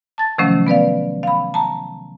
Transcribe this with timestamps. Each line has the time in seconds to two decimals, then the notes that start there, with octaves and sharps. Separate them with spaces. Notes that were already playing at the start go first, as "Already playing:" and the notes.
0.18 A5 A6
0.38 C3 D#3 F3 F#3 A3 C#4
0.67 B3 B4 D5 F5
1.23 F5 B5
1.54 A5 A#5